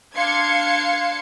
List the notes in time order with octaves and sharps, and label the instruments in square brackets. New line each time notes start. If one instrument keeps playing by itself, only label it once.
[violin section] D4 F5 C6 G#6 C#7